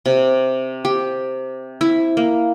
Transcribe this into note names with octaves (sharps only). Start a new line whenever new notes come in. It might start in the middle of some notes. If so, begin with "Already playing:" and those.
C3
G4
E4
A#3